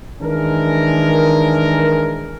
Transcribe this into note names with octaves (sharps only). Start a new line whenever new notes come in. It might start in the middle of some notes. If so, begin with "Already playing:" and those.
D#3 E3 G#3 D4 A#4